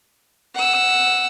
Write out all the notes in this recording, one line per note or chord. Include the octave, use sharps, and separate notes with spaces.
F#5 E6